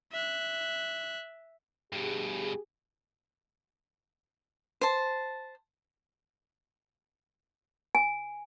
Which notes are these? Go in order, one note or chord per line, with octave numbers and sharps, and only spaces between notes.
E5 F#6
G2 B2 G4 G#4
C5 A5
G#5